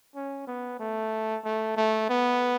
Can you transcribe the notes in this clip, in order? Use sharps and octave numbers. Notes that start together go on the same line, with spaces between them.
C#4
B3
A3
A3
A3
B3